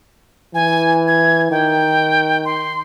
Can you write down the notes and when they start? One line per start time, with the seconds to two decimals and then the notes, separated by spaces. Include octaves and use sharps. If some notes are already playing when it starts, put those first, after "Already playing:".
0.54 E3 G#5
1.08 G#6
1.51 D#3 G5
2.45 C6